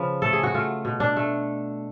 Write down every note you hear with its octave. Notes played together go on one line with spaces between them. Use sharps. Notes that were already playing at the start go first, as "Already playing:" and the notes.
Already playing: C#3 F3 B4
A3 A4
G#4
F#4
A3 F4
B2
D4
A3